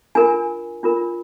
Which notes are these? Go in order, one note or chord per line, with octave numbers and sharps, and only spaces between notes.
D4 F4 A#4 G#5
D4 F4 A#4